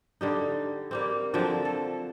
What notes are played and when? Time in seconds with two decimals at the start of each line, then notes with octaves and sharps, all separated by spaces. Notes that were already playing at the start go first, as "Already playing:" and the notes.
0.21 D3 G3 D#4
0.91 G3 A#3 C4
1.34 D3 F3 F#3 C4
1.65 A4